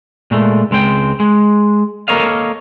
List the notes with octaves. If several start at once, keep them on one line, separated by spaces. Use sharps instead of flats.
A#2 G#3 A3
C#2 G#3 C4 G5
G#3
A#3 A4 A#4 C#5 D#5 F5